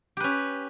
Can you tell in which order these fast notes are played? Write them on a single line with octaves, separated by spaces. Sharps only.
G4 B4 C#4